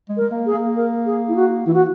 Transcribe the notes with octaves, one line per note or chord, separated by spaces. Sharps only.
G#3
A#4
G#3
A#3
G#4
A#3
A#4
G#4
E4
F#4
E3 E4
F#4